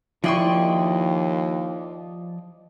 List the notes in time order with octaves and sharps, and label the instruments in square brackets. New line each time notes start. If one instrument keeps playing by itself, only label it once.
[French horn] D#2 [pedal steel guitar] F3 D5 D#5 [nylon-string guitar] E4 [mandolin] G5 C6 C#6